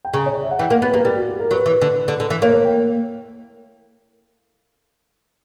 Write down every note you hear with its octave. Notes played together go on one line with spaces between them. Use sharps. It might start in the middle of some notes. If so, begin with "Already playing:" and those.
G5
C#3 A#5
C#5
D5
E5
F#5
E3 G5
A#3 F#5
B3 B4
A#3 A#4
G3 G4
F#4
G4
A#4
F#3 B4
E3
D3
D3
D3
E3
A#3 C#5
C#5
G5